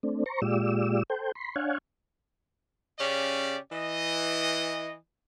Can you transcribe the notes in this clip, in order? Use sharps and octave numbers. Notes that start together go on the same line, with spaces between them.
A3 C4 D4
C5 A#5 C#6
A#2 G#3 F4 G4 D5 E6
A4 C5 G5
B5 C6
D4 C#5 F5 F#5 G#5
C#3 C#4 G4 D5
E3 D#5